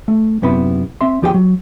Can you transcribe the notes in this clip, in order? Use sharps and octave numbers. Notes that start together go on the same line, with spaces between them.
A3
F#2 C3 B3 E4 B5
C4 E5 C6
E2 F3 G4 G#4 B4 G5
F#3